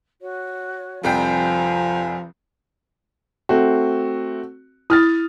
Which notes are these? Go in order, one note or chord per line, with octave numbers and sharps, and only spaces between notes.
F#4 C#5
F1 C2 F3 G5 G#5
A3 C4 F#4
E4 D#6 F6 A6